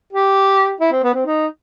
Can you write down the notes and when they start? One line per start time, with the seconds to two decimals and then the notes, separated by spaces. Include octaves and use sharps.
0.13 G4
0.80 E4
0.92 C4
1.03 B3
1.14 C4
1.26 D#4